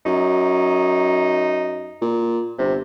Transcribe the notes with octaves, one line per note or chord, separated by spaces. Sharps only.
F#2 D#4
A#2
G1 C3